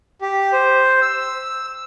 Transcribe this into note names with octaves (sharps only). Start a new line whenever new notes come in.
G4
C5
E6